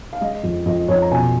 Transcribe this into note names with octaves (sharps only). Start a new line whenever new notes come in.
F5
G#3 D#5
F2
F2 D#5
F2 C#5
A#5
B2 G#5